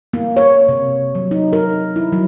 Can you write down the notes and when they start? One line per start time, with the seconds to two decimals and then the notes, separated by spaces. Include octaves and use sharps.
0.13 A#3
0.37 C#5
0.69 C3
1.15 F#3
1.31 D#4
1.53 A#4
1.96 E4
2.13 F#3